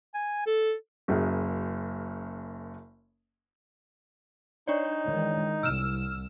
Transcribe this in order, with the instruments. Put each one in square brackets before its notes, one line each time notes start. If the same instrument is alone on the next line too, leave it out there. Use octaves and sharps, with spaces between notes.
[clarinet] G#5
A4
[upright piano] F#1 F#2 G#4
[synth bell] D4 C#5 D5 [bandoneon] D#4
[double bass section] D#3 E3 G#3
[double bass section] C2 [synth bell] E6 F6 E7